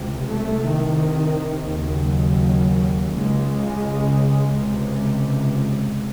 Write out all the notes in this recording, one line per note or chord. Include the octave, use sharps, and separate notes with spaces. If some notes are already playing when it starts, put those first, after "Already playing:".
Already playing: C#2 C3
C2 C3 A3
D#3
D#2 C#3 F#3
C#2 C#3 G#3
C#2 C3